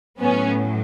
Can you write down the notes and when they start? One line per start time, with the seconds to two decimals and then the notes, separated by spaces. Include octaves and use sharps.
0.19 A2 F#3 B3 C#4